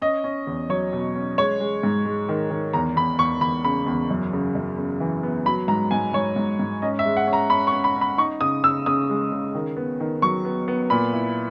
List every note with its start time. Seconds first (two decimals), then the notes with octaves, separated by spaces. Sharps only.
0.02 C#4 D#5
0.24 C#4
0.47 E2
0.69 F#3 C#5
0.93 B2
1.15 C#4
1.38 G#3 C#5
1.60 G#3
1.83 G#2
2.05 G#3
2.29 D#3
2.51 D#3
2.73 E2 A#5
2.97 E2 B5
3.19 E2 C#6
3.41 E2 B5
3.65 C#3 B5
3.87 E2
4.10 F#2
4.33 C#3
4.55 F#2
4.79 C#3
5.00 E3
5.23 B3
5.46 F#3 B5
5.68 G#2 A#5
5.91 G#2 G#5
6.13 G#2 C#5
6.36 G#2
6.59 G#2
6.82 C#4 D#5
6.99 E5
7.05 G#3
7.17 F#5
7.27 C#4
7.33 A#5
7.50 C#4 B5
7.67 C#6
7.72 C#4
7.84 B5
7.96 C#4
8.01 B5
8.18 D#4 C#6
8.41 C#3 D#6
8.64 C#3 E6
8.86 C#3 D#6
9.10 G#3
9.32 C#3
9.55 D#3
9.77 B3
10.00 D#3
10.22 F#3 C#6
10.45 B3
10.68 B3
10.90 A#2 B5
11.13 E4